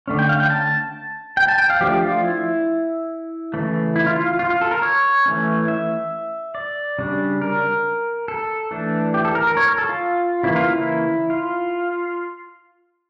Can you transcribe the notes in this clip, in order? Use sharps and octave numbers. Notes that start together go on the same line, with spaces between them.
D3 A3 C#4
G5
F5
G5
A5
G5
A5
G5
F5
F3 A3 D4 G4
F4
E4
C#3 E3 A3
E4
F4
F4
F4
F4
A4
A#4
C#5
E3 A3 C#4
E5
D5
C#3 G3 D4
A#4
A4
E3 A3 D4
G4
A4
A#4
A#4
C#5
A#4
A4
F4
C#3 E3 A#3 E4
F4
E4
F4